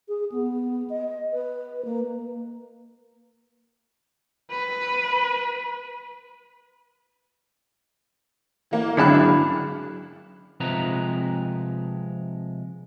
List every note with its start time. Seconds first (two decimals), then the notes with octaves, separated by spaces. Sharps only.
0.08 G#4
0.32 B3
0.90 D#5
1.33 B4
1.85 A#3
4.51 B4
8.71 E3 A#3
8.97 G#1 F#2 D3 G#3 E4 A5 F6 F#6
10.60 C3 F3 G#3 B4 A#5